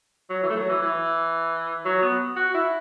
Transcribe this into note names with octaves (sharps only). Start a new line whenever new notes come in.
F#3
E3
A3
F#3
E3
E3
F#3
B3
F#4
E4